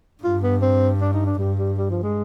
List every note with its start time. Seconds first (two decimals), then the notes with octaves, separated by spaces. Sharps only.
0.23 G2 F4
0.43 B3
0.62 C4
1.01 D4
1.13 D#4
1.26 D4
1.39 G2 G3
1.58 G3
1.78 G3
1.91 F3
2.03 G#3